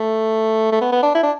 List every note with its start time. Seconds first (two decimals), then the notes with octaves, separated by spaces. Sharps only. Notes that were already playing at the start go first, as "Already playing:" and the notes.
Already playing: A3
0.72 A3
0.81 B3
0.92 B3
1.03 D4
1.15 E4
1.23 D4